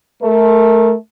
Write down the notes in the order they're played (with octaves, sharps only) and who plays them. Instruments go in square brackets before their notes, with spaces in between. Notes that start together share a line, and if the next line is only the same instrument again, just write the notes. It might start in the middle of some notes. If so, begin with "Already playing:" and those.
[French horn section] A3 A#4